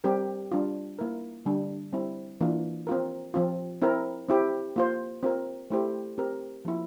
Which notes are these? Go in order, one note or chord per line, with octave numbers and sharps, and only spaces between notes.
G3 C4 G4 A#4
G3 D4 F4
A#3 E4 A#4
D3 G3 D4
G3 C4 E4
E3 A#3 D4 F4
C4 F4 A#4
F3 C4 F4
C4 E4 A#4
C4 E4 G4
A#3 F4 C5
C4 F4 A#4
A3 E4 G4 C5
C4 G4 A#4
F3 A#3 E4